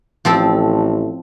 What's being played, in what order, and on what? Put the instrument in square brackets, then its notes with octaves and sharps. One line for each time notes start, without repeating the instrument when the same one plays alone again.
[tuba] A1 [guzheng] F3 C4 A4